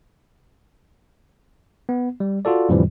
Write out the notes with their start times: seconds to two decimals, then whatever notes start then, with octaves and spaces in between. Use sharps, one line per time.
1.89 B3
2.20 G3
2.45 F4 F#4 A4 D5
2.69 F2 A2 D3 E3 F3 G3